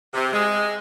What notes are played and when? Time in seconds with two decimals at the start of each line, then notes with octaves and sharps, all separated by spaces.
0.14 C3
0.33 G#3